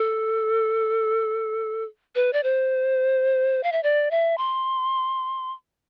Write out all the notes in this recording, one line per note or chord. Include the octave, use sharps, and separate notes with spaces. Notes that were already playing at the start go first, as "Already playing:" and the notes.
Already playing: A4
B4
D5
C5
F5
E5
D5
E5
C6